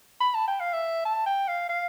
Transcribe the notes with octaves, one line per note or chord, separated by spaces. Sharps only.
B5
A5
G5
F5
E5
A5
G5
F5
F5